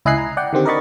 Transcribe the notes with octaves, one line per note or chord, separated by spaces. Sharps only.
C#2 E4 D#5 G#5 F#6 C7
A#5
D5 F#5 G5
D3 D#3 C4 G4
A#4 D5 D#5 B5 C#6 A6